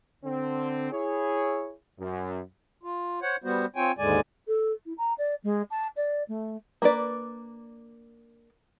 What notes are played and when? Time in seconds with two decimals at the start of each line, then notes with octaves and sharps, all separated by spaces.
0.24 D3 C4
0.92 E4 G#4 C#5
2.00 F#2
2.83 F4
3.22 C5 C#5 F#5
3.44 G3 B3 F#4 C5
3.76 C4 F4 C#5 G5 G#5
3.98 D#2 G#2 D3 G#3 D5 G#5
4.47 A4
4.85 E4
4.97 A#5
5.18 D5
5.43 G#3
5.70 A5
5.96 D5
6.28 A3
6.82 A#3 D4 B4 D5